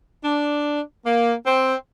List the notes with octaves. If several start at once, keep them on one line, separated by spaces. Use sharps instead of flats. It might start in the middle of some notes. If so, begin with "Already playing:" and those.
D4
A#3
C4